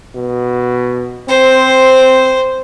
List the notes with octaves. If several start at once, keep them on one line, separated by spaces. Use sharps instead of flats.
B2
C4 C5